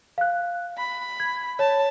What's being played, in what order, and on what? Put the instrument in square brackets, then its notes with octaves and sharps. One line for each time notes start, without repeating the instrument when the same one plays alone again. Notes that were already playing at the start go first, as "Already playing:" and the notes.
[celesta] F5 F#6
[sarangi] B5
[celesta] G#6
[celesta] C#5 [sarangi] A5